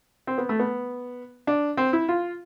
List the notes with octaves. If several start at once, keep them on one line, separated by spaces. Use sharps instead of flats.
C4
B3
A3
B3
D4
C4
E4
F4